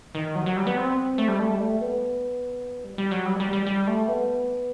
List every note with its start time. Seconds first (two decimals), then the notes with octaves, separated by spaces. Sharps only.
0.15 D#3
0.35 F#3
0.46 F#3
0.57 G3
0.67 B3
0.77 C4
1.18 A3
1.28 G3
1.39 A3
1.49 G3
1.60 A3
1.81 B3
2.84 G3
2.98 G3
3.11 F#3
3.26 G3
3.40 G3
3.53 G3
3.67 G3
3.87 A3
4.08 B3